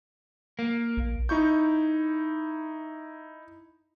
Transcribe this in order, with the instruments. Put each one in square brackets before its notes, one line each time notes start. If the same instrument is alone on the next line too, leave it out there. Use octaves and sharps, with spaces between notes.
[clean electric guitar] A#3
[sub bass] A#1
[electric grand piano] D#4 E4 C#6 G6